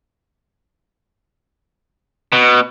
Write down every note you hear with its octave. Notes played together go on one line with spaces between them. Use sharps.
B2